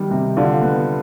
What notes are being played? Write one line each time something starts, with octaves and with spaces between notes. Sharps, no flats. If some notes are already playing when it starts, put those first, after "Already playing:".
Already playing: D#3 G3 B3
C3
D3 F4
B3